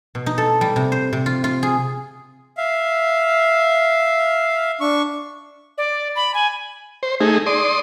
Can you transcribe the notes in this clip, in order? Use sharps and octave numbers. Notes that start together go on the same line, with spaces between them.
B2
D#4
A4
G3
C3
C5
C3
F4
F4
G#4
E5 F5
D4 C#6
D5
B5
G#5
C5
A3 D#4 G#4
D5 C6 D#6